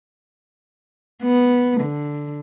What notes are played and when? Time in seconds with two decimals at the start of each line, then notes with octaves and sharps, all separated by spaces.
1.23 B3
1.79 D3